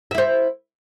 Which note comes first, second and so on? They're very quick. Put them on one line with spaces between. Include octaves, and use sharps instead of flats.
E5 E4 C5